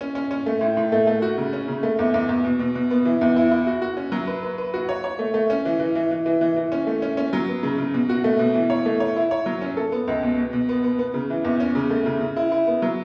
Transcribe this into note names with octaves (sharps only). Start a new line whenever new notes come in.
C#4
C#4
C#4
A3
A2
A2
A3
A3
F#4
C#3
C#4
C#3
A3
E2
E2
E2
B2
B2
B2
B3
E3
E2
E4
E4
F#4
F#4
C#4
F#3
B4
B4
B4
F#4
C#5
C#5
A3
A3
C#4
E3
E3
E3
E3
E3
E3
E3
C#4
A3
C#4
C#4
F#3
B3
C#3
C#3
B2
F#4
A3
B2
E3
C#5
A3
C#5
E4
C#5
F#3
C#4
A4
B3
C#2
B2
B2
B2
B3
B3
B3
C#3
E3
E2
C#4
C#3
A3
C#3
C#3
E4
E4
B3
F#3